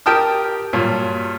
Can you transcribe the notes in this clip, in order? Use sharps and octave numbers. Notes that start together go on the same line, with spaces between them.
G4 A#4 G5 A5 D#6 F6
G2 A#2 F#3